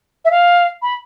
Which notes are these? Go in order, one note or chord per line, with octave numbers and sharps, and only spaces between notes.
E5
F5
B5